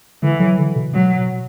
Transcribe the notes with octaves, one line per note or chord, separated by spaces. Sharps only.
D3 E3
F#3
D3
B2
B2 F#3
B2